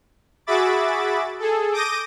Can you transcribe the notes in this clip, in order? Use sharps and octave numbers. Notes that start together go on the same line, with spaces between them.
F#4 G#4 E5 B5 D6 A6
G#4 A4
D6 D#6 G6 A#6 D7 D#7